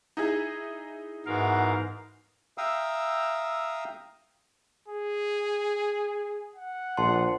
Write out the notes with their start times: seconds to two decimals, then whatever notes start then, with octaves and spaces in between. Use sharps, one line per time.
0.17 D#4 E4 G#4
1.26 G#2 E3 B3 F#4 A#4 F5
2.58 E5 F5 G5 A#5 D#6 E6
4.88 G#4
6.56 F#5
6.97 A#1 C5 A5 C6